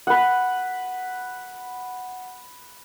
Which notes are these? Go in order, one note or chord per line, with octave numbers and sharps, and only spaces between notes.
B4 F#5